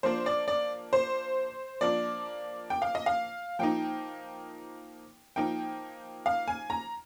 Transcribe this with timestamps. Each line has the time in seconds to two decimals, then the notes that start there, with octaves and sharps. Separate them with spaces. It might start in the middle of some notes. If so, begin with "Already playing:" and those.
0.03 F3 A#3 D4 C5
0.26 D5
0.48 D5
0.93 C5
1.81 F3 A#3 D4 D5
2.70 G5
2.82 F5
2.95 D#5
3.06 F5
3.59 F3 A#3 D#4 G5
5.36 F3 A#3 D#4 G5
6.26 F5
6.48 G#5
6.70 A#5